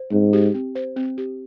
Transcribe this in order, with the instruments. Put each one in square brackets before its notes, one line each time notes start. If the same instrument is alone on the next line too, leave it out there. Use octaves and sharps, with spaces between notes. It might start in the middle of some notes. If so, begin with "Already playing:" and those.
Already playing: [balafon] C5
[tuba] G#2 [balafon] C4
[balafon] G4
C4
C5
C4
G4